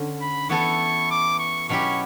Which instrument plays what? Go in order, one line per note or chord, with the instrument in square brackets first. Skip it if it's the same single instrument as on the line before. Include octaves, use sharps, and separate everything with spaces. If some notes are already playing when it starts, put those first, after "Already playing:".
Already playing: [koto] D3 C#4
[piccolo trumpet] B5
[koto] E3 B3 E4 A4 [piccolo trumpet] C#6
[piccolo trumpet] D6
C#6
[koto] B2 F#3 C#4 E4 G4 [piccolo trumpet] C#6